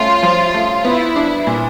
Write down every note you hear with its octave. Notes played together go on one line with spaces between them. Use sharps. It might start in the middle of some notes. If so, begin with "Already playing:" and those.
Already playing: A3 C#4 F4
F3
A3
B3 E4
D4
A#2